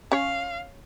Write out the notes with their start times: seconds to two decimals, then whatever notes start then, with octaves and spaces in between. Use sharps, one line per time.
0.12 C#4 C#5 F5